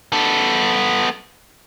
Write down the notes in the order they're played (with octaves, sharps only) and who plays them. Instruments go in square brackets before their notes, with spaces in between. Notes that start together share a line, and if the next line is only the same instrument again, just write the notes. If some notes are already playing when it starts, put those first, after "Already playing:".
[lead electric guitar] B3 A4